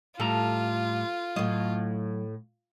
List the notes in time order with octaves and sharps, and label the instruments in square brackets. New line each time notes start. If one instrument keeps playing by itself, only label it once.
[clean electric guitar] A2 G3 A#5 [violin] F4 [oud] A4
[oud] A2 D#5 [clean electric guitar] F#3